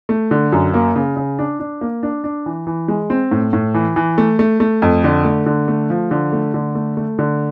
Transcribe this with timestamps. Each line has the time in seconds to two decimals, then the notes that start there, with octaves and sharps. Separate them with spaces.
0.09 A3
0.31 D3
0.52 F#2
0.74 A#3
0.96 C#3
1.17 C#3
1.39 D4
1.60 D4
1.81 A#3
2.03 D4
2.24 D4
2.46 E3
2.67 E3
2.88 G#3
3.10 C4
3.31 A2
3.53 A2
3.74 E3
3.96 E3
4.18 A3
4.39 A3
4.60 A3
4.82 F2
5.04 D3
5.25 A3
5.46 D3
5.68 A3
5.90 F3
6.11 D3
6.32 A3
6.54 D3
6.75 A3
6.97 A3
7.19 D3